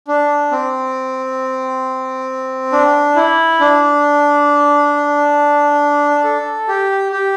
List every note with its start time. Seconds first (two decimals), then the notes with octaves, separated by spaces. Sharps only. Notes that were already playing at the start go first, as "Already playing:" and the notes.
0.08 D4
0.52 C4
2.72 D4
3.16 E4
3.60 D4
6.24 A4
6.68 G4
7.12 G4